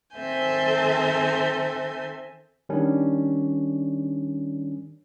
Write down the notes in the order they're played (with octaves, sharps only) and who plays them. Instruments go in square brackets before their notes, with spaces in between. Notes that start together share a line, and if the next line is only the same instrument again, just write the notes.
[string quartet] D#3 C4 A4 E5 G#5 G6
[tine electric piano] D#3 G3 C#4 D4